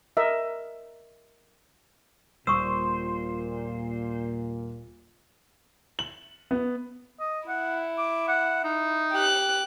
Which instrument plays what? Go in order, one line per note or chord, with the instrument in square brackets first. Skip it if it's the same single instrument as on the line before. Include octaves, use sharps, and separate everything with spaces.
[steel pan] A#4 D#5 E5
[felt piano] D#1 [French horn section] A#2 [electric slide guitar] C5 [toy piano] C#6 D#6 E6
[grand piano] F#7
B3
[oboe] D#5
[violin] E4 [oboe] F#5
[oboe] D6
F#5
D#4
[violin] G4 F#6